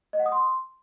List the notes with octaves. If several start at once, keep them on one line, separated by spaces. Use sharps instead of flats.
D#5
F#5
D#6
C6